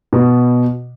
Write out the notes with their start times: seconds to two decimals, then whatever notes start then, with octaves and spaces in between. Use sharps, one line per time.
0.13 B2